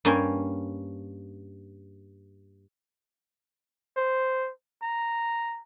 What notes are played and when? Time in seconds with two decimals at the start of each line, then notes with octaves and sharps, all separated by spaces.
0.05 G2 A#3 C#4 G5 G#5
3.96 C5
4.82 A#5